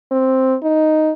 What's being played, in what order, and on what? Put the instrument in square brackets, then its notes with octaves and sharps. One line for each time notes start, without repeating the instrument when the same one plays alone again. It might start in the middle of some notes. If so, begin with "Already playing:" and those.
[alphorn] C4
D#4